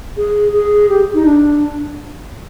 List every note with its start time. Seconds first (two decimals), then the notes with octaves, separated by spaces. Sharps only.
0.17 G#4
0.53 G#4
0.89 G4
1.14 D#4
1.25 D4